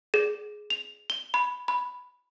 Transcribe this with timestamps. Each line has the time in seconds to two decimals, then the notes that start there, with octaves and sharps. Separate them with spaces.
0.14 G#4
0.70 F7
1.10 G7
1.34 B5
1.68 B5